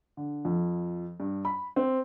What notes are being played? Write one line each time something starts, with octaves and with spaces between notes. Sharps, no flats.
D3
F2
G2
B5
C4